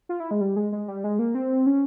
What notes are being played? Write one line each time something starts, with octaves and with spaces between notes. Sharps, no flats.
F4
E4
G#3
G3
G#3
G#3
G3
G#3
A#3
C4
C#4